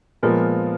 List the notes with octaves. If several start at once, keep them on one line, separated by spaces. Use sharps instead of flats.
A#2 F3 G#3 B3 A#4